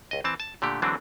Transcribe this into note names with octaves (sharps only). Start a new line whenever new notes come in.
C#2 D#5
E3 C4 A5
A5
A#2 D3 A3 G4
D3 E3 F#3 G#3 C4 D4